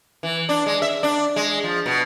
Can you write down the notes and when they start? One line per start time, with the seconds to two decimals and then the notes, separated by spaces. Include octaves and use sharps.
0.23 E3
0.49 D4
0.66 G#3
0.82 E5
1.03 D4
1.36 G#3
1.64 F3
1.86 B2